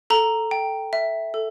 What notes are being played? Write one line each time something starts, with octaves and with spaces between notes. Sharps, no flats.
A4 A#5
G5
E5
A4